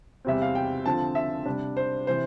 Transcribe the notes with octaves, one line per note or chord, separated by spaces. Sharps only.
E2 C3 G3 C4 E5
F5
G5
D3 F3 C4 F4 A5
E5
C3 G3 D4
C5
C3 E3 C5